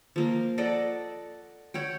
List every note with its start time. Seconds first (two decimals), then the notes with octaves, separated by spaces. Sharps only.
0.16 F3 A#3
0.58 A4 D5 D#5 F#5
1.74 C#5 F#5 G5